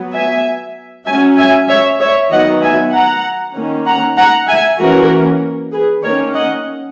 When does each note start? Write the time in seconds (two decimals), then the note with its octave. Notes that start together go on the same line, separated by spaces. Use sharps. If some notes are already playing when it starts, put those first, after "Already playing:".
Already playing: F#3 B3
0.14 E5 G#5
1.06 F#3 C#4 E5 G#5
1.37 E5 G#5
1.69 C#5 E5
2.00 C#5 E5
2.31 D#3 F#3 B3 D#5 F#5
2.62 E5 G#5
2.93 F#5 A#5
3.55 D#3 A#3 C#4
3.86 F#5 A#5
4.17 F#5 A#5
4.48 E5 G#5
4.79 E3 A#3 C#4 F#4 A#4
5.72 G#4 B4
6.03 D#3 A#3 C#4 A#4 C#5
6.34 D#5 F#5